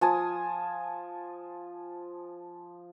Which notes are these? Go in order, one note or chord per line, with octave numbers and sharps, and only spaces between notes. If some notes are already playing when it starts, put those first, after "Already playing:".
F3 G#5 A5 D#6